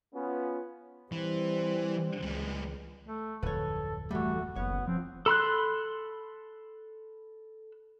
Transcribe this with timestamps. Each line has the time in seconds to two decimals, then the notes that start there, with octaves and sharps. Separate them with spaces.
0.14 B3 C#4 F4
1.12 E3 G3 C4
2.22 C#2 G3 G#3
3.06 A3
3.43 D1 F2 A4 B4 C#5
4.11 E3 G3 A3 F#4
4.56 F#1 B3 C#5
4.87 F3 C4
5.26 A4 B5 C6 F#6